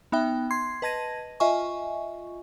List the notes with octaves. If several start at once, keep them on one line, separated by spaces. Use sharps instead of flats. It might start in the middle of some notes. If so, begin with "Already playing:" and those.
B3 D#4 E5 G5
C6 G#6 C7
B4 D#5 A5 G#6 A#6 D#7
F4 D#5 E5 G#5 C#6